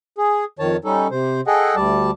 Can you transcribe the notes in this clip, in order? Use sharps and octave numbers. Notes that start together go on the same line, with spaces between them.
G#4
F2 D#3 C#5 A5
G3 C#4 D#4 A4
C3 C5
G#4 A4 D#5 F#5 G5
D2 G3 D5 A5